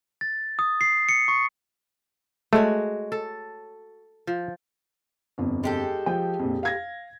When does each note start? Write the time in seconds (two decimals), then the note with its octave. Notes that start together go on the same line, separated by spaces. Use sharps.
0.21 A6
0.59 D#6
0.81 C7
1.09 C#7
1.28 C#6
2.53 G#3 A3 F#4 C#5
3.12 A4
4.27 F3
5.38 G1 F2
5.64 G#3 G4 A4
6.06 F3 G5
6.39 A#1 F2
6.63 F5 G#6 A#6